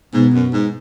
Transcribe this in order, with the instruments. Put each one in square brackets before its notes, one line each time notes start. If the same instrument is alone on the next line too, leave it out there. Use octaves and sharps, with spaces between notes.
[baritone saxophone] G#2 [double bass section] B2 B3
[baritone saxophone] F#2
G#2